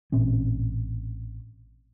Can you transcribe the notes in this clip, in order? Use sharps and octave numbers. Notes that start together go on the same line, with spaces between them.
A1 A#2 C4 C#4